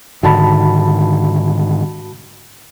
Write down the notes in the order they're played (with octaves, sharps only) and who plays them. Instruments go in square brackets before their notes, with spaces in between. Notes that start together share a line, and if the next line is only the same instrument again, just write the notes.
[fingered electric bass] G#2 D3 D#3 [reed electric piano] F#4 A5 B5